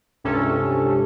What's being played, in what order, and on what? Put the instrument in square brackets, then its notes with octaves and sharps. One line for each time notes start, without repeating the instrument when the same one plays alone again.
[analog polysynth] C#2 G2 C3 C#4 A4